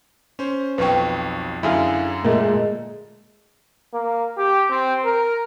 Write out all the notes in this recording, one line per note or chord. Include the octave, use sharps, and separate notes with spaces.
C#4 C5
B1 F2 B4 G5 C#6
F#2 D3 E4 G#4 F5
A#2 G#3 A3 A#4
A#3
G4
C4
A#4